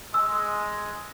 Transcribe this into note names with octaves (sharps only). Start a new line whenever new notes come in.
G#3 E6